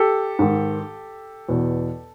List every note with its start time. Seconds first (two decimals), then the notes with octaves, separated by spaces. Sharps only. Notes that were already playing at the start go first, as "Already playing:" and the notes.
Already playing: G4 A4
0.39 G#2 D#3
1.49 E2 B2